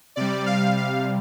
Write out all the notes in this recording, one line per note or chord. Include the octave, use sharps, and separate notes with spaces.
C3 G3 D5
F5
F5